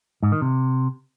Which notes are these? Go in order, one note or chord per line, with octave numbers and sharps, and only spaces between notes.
G#2
D#3
C3